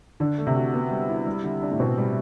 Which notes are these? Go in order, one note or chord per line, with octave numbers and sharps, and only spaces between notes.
D3 D4
A3
C3
F#4
B3
G3
E4
G3
D3
D4
A2
B2 C4
G3